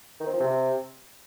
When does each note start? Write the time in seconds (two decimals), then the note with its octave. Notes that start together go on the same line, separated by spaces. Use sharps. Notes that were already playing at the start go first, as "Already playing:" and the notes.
0.20 D#3
0.27 C4
0.33 F3
0.40 C3